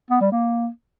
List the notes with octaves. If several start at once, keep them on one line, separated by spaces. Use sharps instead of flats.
B3
G3
A#3